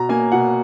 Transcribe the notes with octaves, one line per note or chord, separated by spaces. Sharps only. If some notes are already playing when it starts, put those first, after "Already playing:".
Already playing: B2 A#5
A#3 G#5
B2 F#5